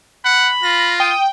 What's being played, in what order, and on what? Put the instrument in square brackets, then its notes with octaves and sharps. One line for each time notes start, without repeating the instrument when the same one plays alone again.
[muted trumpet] F#5 [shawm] B5
[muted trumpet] F4 [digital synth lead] A#6
[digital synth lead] G5 [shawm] D#6